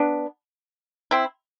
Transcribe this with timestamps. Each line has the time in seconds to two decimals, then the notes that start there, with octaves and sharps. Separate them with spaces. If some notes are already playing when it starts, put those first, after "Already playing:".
Already playing: B3 D4
1.11 C4 E4